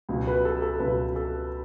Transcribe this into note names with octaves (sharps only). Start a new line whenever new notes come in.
C#2 B2 F#3
B4
A4
A4
C#2 B2 F#3 B4
A4